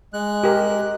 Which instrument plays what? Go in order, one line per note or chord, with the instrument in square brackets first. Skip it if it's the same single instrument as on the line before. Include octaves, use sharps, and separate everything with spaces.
[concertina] G#3 F#6
[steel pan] G4 A#4